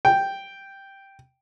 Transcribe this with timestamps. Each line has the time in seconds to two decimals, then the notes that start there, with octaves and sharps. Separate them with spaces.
0.05 G5